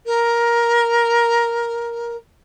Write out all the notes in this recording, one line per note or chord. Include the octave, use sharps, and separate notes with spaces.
A#4